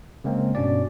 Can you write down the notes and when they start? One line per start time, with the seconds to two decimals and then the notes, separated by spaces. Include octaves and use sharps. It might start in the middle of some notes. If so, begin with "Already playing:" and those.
0.24 C#3 G#3 A#3 C4
0.55 G2 B2 C#4 D4 D5